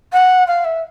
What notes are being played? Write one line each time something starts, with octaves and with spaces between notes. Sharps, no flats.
F#5
F5
E5